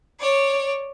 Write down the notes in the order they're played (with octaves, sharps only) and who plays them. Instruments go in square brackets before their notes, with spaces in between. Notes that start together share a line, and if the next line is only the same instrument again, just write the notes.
[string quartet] C#5 D5